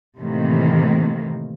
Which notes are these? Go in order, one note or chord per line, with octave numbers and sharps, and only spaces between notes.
A2 C3 D#3 E3 A#3